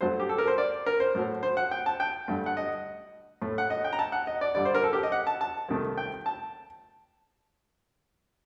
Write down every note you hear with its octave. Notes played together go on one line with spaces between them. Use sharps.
G2 F#3 A3 C5
G4
A4
A#4
C5
D5
A#4
C5
A2 F#3 A3
C5
F#5
G5
A5
G5
G2 D3 A3
F#5
D#5
A2 A3
F#5
D#5
G5
A#5
A5
F#5
D#5
D5
G2 D3 G3 D5
C5
A#4
A4
G4
D#5
F#5
A5
A5
C2 C3 D#3 A3
G5
A5